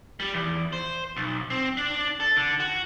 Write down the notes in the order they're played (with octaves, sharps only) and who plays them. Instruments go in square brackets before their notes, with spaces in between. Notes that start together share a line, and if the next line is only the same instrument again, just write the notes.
[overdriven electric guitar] G3
E2
C5
B1
C4
D4
A4
D3
F#4